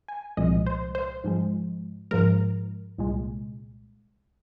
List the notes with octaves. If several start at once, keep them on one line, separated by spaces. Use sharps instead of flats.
G#5
C2 A#2 F3 G#3 D#5
C5
C5
G#2 F3 G#3
G#2 F3 G#3 A#4
C2 A#2 G#3